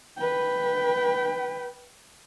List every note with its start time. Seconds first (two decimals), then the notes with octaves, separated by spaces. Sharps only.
0.17 B4 G5